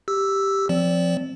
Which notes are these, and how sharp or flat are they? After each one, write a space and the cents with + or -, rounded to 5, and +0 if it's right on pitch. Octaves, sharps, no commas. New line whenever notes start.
G4 +0 E6 +0
F3 +5 C4 +0 D5 -20